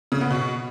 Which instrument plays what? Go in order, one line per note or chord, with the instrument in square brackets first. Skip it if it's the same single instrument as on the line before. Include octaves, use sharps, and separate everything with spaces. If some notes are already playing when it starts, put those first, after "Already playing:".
[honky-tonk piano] C#3
B3
B2